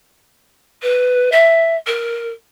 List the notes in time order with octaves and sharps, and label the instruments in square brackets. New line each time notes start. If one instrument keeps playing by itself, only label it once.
[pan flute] B4
E5
A#4